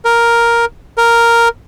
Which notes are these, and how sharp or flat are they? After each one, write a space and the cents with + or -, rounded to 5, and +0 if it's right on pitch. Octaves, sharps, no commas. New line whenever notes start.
A#4 +5
A#4 +0